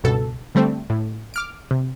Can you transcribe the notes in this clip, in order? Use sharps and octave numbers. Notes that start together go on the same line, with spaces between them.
C#2 G2 B2 A4
D3 G3 A3 C4
A2
D6 F6 D7
C3